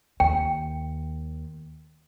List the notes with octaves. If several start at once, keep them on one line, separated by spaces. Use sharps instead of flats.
D#2 G5